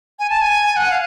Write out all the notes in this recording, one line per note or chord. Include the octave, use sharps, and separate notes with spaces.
G#5
A5
G#5
F#5
F5